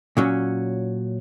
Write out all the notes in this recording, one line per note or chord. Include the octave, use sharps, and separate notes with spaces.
A#2 F#3 C#4